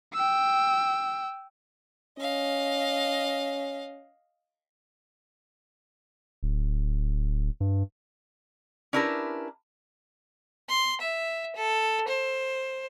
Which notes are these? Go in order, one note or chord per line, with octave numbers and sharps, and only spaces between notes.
G5 E6
C#4 D#5 F5
D1
G2
C#4 D4 E4 G4 A#4 B4
C6
E5
A4
C5